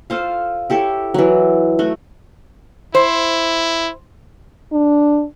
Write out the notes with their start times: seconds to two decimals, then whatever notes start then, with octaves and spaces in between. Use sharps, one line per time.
0.10 F4 A4 C5 F5
0.70 E4 G4 A4 C#5
1.14 E3 F#3
1.79 A3 F#4
2.95 E4 C5
4.72 D4